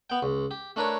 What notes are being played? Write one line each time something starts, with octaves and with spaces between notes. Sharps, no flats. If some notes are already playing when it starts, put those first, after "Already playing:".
B3 G5
C#2
G4
A3 D4 A#4 B4 C#5